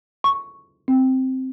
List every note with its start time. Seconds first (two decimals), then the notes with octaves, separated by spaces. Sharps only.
0.24 C#6
0.88 C4